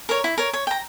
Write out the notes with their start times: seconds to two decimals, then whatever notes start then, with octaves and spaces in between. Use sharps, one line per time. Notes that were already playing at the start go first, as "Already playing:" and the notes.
0.09 A#4 C#5
0.24 E4
0.38 A#4 C#5
0.53 C#5
0.67 G5 A#5